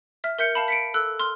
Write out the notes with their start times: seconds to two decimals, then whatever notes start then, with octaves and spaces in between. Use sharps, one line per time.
0.24 E5 F6
0.39 A#4 E5 G6 C#7
0.55 F5 A5 B5
0.68 B6 C#7 D7
0.94 A4 E6 F#6
1.20 C6 F6